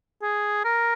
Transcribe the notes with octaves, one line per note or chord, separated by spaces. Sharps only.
G#4
A#4